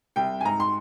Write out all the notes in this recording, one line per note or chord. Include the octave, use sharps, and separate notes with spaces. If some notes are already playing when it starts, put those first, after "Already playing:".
C2 G5
G#5
G#2 A#5
C6